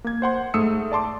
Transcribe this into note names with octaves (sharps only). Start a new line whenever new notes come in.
A#3 G#6
C5 F#5 C6
G#2 A3 D#6 E6 C#7
D5 A5 C6 D6